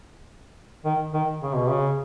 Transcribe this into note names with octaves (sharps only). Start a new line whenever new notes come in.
D#3
D#3
C#3
B2
C#3